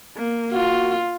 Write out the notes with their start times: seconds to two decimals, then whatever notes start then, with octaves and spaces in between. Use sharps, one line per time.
0.17 A#3
0.52 F4 F#4